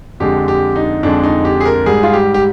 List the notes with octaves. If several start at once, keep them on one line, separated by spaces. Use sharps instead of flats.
F2 D3 G#3 G4
G4
D#4
F2 D3 G#3 D4
D#4
G4
G#4
A#4
G#2 G3 G#4
F4
G4
G4